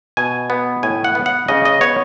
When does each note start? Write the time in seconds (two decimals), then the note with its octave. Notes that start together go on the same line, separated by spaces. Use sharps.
0.17 B2 G#5
0.50 B3
0.83 A2 G#5
1.04 F#5
1.15 B3
1.26 F#5
1.48 C#3 D#5
1.65 D#5
1.81 B3 C#5